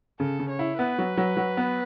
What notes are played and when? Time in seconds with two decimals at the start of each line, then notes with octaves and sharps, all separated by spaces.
0.20 C#3 A4
0.39 C#3
0.49 C#5
0.59 E4
0.79 B3 B4
0.98 F#3
1.17 F#3
1.37 F#3
1.57 B3